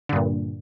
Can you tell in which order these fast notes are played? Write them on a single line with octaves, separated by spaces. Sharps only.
D3 G2 A#2